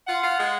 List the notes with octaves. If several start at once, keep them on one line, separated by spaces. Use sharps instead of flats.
F4 F#5
F4
G#3